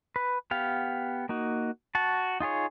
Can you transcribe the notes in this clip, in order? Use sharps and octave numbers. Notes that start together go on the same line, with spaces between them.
B4
B3 G4 F5
A#3 D#4 F#4
F#4 A5
D#4 F4 G#4 C#5